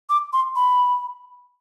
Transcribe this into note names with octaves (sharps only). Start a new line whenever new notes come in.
D6
C6
B5